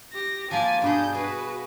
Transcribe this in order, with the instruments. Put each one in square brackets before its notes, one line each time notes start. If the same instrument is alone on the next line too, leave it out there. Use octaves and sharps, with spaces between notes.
[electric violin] G4 A#6
[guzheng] F3 A#3 G4 [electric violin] G#5 A6
[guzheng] G2 B2 G#4 [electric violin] D4 G6
[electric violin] F#4 B4 [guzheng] G#4